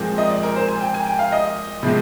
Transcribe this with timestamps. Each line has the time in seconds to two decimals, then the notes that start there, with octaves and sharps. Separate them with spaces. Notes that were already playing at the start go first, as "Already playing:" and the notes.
Already playing: A#2 F3 G#3 C4
0.18 D#5
0.30 D5
0.43 A#4
0.56 C5
0.68 G#5
0.81 G5
0.94 G#5
1.07 G5
1.19 F5
1.32 D#5
1.83 C3 F3 G#3 C4